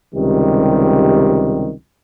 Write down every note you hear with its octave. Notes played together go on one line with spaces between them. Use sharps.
C#2 C3 D#3 G3